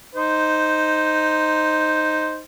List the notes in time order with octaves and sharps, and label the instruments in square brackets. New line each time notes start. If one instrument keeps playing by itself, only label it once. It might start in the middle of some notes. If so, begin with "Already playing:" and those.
[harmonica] D#4 C5